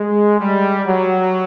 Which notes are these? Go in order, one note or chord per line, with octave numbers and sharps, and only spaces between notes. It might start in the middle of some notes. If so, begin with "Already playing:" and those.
Already playing: G#3
G3
F#3